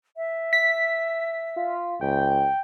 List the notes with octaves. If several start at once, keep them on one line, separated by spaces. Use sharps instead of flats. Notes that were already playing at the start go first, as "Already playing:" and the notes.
E5
B6
F4
C#2 G5